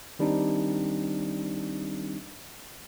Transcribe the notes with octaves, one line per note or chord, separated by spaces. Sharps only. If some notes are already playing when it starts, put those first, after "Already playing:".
D#3 G3 C4 D4 D#4